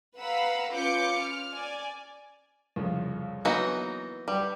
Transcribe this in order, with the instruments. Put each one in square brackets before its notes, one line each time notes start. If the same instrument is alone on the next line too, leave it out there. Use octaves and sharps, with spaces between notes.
[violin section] B4 F5 F#5 A#5 B5 E6
C#4 F4 B4 D6 G6 C#7
F6
D5 G#5
[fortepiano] C2 F2 C#3
[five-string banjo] E3 D#4 F#4 [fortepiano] F#3 A#3 B3
[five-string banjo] G3 [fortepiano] B4 F#5 G5